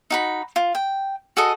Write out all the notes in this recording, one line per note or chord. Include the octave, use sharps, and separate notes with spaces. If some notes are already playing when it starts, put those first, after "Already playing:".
D#4 F#4 B5
F4
G5
F#4 G#4 A4 D#5